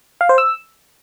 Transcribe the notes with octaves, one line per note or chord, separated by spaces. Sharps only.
F5
C5
E6